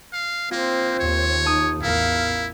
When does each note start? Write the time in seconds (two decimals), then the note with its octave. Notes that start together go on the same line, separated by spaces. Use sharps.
0.13 F5
0.51 A#3 C4 F4 C5
1.00 D#2 C#5
1.45 D#4 A5 D#6
1.82 A1 E2 E4 A#4 F5